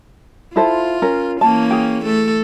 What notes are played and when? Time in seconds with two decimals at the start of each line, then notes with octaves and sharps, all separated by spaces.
0.56 E4 F4 A4 C5
1.02 C#4 A#4
1.41 E3 A#3 C#4 A5
1.71 G#4 G5
2.05 A3 A4